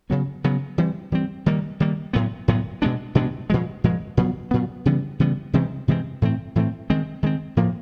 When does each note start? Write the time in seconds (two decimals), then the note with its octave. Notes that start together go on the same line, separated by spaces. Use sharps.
0.10 C#3 F#3 B3
0.44 C#3 F#3 B3
0.78 E3 G3 C4
1.12 E3 G3 C4
1.46 D#3 G3 A#3
1.80 D#3 G3 A#3
2.13 A2 F#3 B3
2.48 A2 F#3 B3
2.82 B2 G#3 B3 D4
3.15 B2 G#3 B3 D4
3.50 A#2 F3 G#3
3.84 A#2 F3 G#3
4.17 A#2 F#3 B3
4.51 A#2 F#3 B3
4.85 C#3 E3 G3 B3
5.19 C#3 E3 G3 B3
5.53 C3 E3 G#3 C4
5.88 C3 E3 G#3 C4
6.22 A2 E3 A3 C4
6.55 A2 E3 A3 C4
6.90 D#3 G#3 C4
7.23 D#3 G#3 C4
7.57 A2 F3 A#3